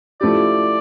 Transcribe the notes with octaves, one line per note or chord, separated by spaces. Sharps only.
F3 A3 E4 G4 D5